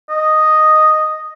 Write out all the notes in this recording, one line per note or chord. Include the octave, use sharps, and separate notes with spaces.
D#5